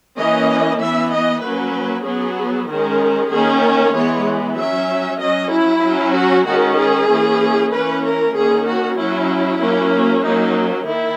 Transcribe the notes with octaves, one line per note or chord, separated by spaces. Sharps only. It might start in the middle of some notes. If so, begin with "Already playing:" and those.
E3 A#3 C#4 D#5
E3 B3 E5
D#5
F#3 A#3 C#4 B4
F#3 B3 G#4
D#3 G#3 C#4 A#4
D#3 A#3 C#4 G#4
A#4
E3 G#3 B3 C#5
F#3 C#4 E5
F#3 C#4 D#5
E4
F#3 C#4
F#4
D#3 G#3 C#4 F#4
G#4
E3 A#3 C#4
E3 A#3 C#4 B4
A#4
D#3 A#3 C#4 G#4
F#4
F#3 C#4 E4
F#3 A#3 C#4
F#3 A#3 C#4 D#4
D#3 E4